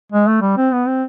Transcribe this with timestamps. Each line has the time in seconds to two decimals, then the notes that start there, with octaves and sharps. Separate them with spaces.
0.12 G#3
0.27 A3
0.42 G3
0.57 C4
0.72 B3
0.88 C4